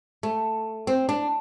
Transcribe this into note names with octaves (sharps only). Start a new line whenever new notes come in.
A3
C4
D4